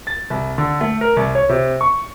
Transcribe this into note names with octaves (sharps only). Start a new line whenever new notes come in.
A6
C2
D3
A3
A#4
C2
C#5
C3
C#6